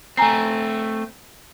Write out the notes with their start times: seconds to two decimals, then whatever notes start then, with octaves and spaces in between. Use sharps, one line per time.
0.17 A3 C4 G#5 A#5 C7